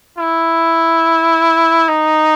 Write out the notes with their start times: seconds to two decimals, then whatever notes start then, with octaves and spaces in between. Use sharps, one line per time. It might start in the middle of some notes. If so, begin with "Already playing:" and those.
0.18 E4
1.88 D#4